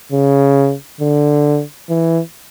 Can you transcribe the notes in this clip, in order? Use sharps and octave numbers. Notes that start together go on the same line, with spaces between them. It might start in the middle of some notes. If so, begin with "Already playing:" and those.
C#3
D3
E3